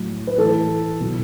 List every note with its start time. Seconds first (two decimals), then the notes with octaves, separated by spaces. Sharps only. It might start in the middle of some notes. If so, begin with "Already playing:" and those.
Already playing: A2 F#3
0.27 B4
0.38 A2 E3 A4
1.00 B2 F#3